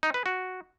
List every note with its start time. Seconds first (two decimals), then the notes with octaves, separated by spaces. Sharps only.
0.03 D#4
0.14 B4
0.26 F#4